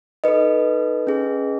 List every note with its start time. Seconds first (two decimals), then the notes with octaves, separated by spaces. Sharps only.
0.24 D#4 A4 B4 D#5
1.07 C#4 G#4